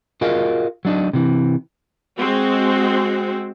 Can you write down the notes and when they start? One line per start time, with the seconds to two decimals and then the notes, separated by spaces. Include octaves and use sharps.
0.21 F4 F#4 G#4 A#4 D#5 F5
0.85 F#3 D4 D#4
1.13 C3 E3
2.19 G#3 C4 F#4